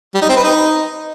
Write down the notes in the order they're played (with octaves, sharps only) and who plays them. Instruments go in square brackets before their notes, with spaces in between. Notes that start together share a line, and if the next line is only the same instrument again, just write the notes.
[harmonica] G3
D#4
C4
B4
D#4